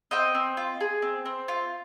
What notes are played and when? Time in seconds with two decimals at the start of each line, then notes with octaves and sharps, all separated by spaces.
0.11 C4 D#5 G5
0.35 C4
0.57 F4
0.80 G#4
1.02 C4
1.26 C4
1.48 F4